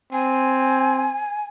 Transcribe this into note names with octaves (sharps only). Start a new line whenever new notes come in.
C4 G#5